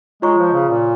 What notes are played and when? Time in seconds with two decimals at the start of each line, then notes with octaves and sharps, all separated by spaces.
0.22 G#3 F4 C#5 A#5 C#6
0.38 F3
0.53 C#3
0.69 A#2